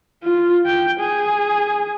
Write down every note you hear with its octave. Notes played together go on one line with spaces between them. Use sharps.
F4
G5
G#4